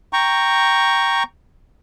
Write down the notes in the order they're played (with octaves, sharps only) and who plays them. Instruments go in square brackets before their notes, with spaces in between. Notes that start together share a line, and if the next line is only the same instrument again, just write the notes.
[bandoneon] G5 A#5 C#6